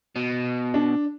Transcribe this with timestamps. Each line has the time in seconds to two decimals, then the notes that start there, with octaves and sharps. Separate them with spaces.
0.16 B2
0.74 D4